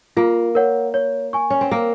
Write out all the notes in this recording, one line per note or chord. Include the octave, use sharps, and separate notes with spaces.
A#3 F4
A#4 C#5 F#5
C#5
G#5 C#6
C#4
C4
A#3 A#4